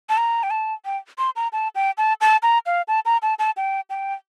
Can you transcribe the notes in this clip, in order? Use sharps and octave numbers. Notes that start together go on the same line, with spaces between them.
A5
A#5
G5
A5
G5
C6
A#5
A5
G5
A5
A5
A#5
F5
A5
A#5
A5
A5
G5
G5